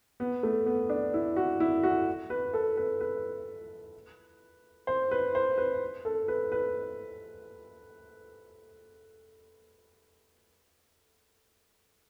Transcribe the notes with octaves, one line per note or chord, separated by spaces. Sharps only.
B3
A3
B3
D4
E4
F#4
E4
F#4
B4
A4
B4
B4
C5
B4
C5
B4
A4
B4
B4